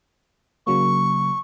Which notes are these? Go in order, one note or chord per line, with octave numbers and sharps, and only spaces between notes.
C#3 F#3 A#3 C#6